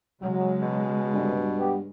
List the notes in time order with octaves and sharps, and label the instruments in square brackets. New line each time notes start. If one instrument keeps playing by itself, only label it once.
[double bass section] C#3 G#3 [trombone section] F#3
[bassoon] B2
[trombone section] D2 C3 [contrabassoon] G2
[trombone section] B3 G4